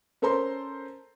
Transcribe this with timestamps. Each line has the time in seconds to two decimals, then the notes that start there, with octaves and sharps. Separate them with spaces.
0.22 C#4 A4 A#4 C5 A#5 C6